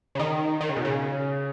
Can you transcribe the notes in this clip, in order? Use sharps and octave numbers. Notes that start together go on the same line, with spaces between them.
C#3
D#3
D#3
C#3
B2
C#3